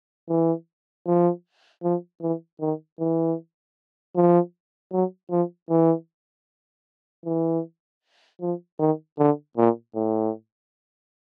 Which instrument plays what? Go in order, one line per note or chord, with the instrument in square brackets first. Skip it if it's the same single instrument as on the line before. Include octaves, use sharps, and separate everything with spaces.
[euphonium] E3
F3
F3
E3
D#3
E3
F3
F#3
F3
E3
E3
F3
D#3
D3
A#2
A2